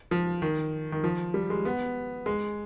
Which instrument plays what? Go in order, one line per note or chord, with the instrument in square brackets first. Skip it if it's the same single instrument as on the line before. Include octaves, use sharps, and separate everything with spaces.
[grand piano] F3
D#3
D#3
F3
G3
G#3
B3
G#3